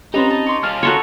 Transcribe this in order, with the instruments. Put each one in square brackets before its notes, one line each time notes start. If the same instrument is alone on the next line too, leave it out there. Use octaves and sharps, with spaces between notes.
[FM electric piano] C4 C#4 G4 [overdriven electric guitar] D#4 [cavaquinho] F4 B4 A#5
[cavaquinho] A5
C#5 C6 D6
[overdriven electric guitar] C#4 F4 [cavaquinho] A5 [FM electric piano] F6
[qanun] F#4 A4 C#5 [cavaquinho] A#4 A#5 C6